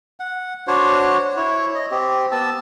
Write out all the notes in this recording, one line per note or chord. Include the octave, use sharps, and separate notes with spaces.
F#5
D4 F#4 C5 C#5
E4 C#5
D#5
C4 G4
B3 A5 E6